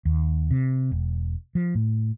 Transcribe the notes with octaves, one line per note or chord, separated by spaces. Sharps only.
D#2
C3
E1
F3
A2